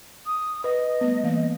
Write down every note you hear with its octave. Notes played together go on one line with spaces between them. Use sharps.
D#6
B4 D#5
G3 A3 B3
E3 A#3 F5